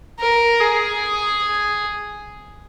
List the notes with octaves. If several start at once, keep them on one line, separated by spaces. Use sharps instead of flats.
A#4
G#4